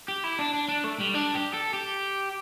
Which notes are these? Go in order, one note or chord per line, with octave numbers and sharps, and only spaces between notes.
G4
E4
D4
D4
D4
A3
G3
D4
G4
A4
G4